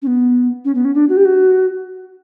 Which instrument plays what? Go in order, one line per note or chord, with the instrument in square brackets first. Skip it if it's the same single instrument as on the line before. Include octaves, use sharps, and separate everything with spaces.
[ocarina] C#4
B3
C#4
B3
C#4
D4
F#4
G4
F#4